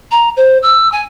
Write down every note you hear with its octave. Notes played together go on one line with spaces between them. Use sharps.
A#5
C5
E6
G#5